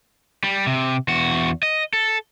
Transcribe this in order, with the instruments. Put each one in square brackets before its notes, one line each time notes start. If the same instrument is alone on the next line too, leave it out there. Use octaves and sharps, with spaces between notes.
[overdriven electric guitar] G3
C3
E2 F#4
D#5
A4